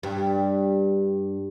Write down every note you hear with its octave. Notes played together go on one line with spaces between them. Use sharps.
G2